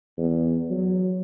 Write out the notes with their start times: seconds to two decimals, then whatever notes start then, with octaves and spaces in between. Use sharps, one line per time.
0.18 E2
0.70 F#3